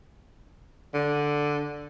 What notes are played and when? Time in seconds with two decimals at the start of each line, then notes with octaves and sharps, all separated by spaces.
0.94 D3